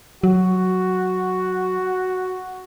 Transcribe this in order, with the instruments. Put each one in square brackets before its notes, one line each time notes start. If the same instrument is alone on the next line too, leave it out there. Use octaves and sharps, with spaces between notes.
[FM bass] F#3 [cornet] F#4